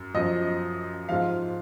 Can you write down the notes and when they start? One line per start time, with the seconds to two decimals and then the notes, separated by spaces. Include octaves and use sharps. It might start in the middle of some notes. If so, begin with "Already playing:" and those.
Already playing: F#2
0.14 F#2 F3 D#5
1.09 G#2 F3 F5